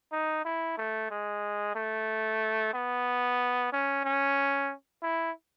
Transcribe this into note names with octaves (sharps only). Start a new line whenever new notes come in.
D#4
E4
A3
G#3
A3
B3
C#4
C#4
E4